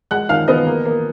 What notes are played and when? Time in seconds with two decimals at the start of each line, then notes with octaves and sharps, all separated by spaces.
0.11 G#3 F#5 F#6
0.29 D#3 F5 F6
0.48 B3 D#5 D#6
0.66 A#3
0.85 A#3